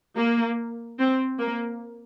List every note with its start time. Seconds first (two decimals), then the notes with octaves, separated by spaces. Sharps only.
0.18 A#3
0.99 C4
1.39 A#3